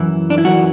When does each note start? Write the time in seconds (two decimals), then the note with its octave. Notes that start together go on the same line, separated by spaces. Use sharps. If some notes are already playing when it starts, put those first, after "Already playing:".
Already playing: F#2 E3 E4
0.30 D4
0.38 E4
0.45 F#2 E3 F#4